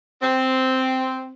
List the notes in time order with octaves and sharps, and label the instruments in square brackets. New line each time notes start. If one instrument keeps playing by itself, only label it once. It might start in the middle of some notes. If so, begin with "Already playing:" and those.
[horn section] C4